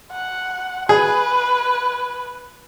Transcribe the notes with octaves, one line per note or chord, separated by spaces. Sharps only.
F#5
G#4 B4